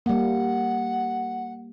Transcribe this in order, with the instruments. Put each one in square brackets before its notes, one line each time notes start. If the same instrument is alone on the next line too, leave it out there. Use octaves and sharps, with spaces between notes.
[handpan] G3 A#3 [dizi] F#5